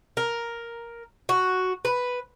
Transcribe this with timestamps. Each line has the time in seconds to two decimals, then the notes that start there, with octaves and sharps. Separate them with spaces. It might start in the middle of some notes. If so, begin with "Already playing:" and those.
0.17 A#4
1.29 F#4
1.85 B4